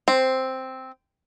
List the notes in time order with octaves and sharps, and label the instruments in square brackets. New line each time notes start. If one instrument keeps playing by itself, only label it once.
[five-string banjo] C4